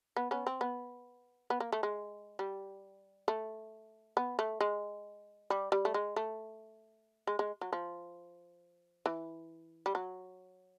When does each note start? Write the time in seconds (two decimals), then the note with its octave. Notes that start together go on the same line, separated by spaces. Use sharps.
0.16 B3
0.31 B3 C#4
0.47 C4
0.61 B3
1.50 B3
1.60 A#3
1.72 A3
1.83 G#3
2.39 G3
3.28 A3
4.17 B3
4.39 A3
4.61 G#3
5.50 G3
5.72 G3
5.85 A3
5.94 G#3
6.16 A3
7.27 G#3
7.39 G#3
7.61 F#3
7.73 F3
9.06 E3
9.86 G3
9.95 F#3